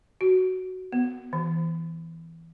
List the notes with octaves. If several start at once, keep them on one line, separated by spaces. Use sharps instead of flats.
F#4
B3
E3